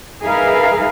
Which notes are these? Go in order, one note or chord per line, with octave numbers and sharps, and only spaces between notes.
D#4 G#4 A#4 B4 E5 F5